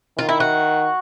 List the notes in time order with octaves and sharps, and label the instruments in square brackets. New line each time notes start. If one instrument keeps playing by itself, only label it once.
[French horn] D#3 [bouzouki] F4
[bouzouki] E4
F#4